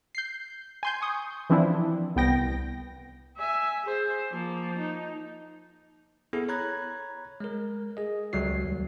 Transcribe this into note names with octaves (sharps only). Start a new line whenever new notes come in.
G6 C7
G#5 C6 G6
C#6 D#6
E3 F3 C4 D4 E4
C2 B3 G5 A#6
E5 G#5
G#4 C5
F3 A#3
D#4
B3 E4 G#4 A4
C#5 A#5 B5 F#6 G#6
G#3 A#4
G#4 D#5
C#2 F#3 G3 F#4 C7
D#2